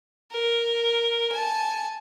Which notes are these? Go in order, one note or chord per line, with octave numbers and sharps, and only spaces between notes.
A#4
G#5 A5